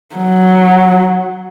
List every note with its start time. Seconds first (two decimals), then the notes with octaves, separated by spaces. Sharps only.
0.16 F#3